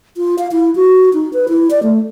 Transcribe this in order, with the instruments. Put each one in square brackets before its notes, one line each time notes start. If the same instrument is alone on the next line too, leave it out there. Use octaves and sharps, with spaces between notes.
[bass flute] F4
F5
E4
F#4
D#4
B4
E4
D5
A3